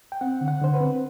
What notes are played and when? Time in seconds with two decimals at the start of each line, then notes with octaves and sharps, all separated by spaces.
0.12 G5
0.21 C4 F#5
0.41 D3
0.48 F#5
0.61 D3 C5
0.74 B4
0.81 C4